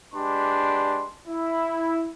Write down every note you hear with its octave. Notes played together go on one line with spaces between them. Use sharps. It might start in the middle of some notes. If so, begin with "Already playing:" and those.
G#3 D4 G4 B4 D5 C6
E4